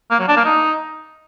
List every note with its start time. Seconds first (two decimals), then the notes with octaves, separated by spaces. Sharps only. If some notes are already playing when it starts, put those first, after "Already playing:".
0.11 A#3
0.19 F#3
0.28 D4
0.36 A#3
0.45 D#4